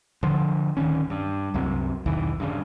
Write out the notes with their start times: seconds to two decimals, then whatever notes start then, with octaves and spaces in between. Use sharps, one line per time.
0.23 D3 F3
0.77 D1 D#3 C#4
1.10 G2
1.54 C2 F#2 C3
2.06 B1 E2 D#3 E3
2.40 G2 C#3